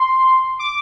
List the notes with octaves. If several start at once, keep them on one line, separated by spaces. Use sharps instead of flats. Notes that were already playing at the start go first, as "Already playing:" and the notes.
Already playing: C6
D6